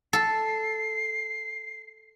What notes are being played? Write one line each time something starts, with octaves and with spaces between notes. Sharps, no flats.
A4 C7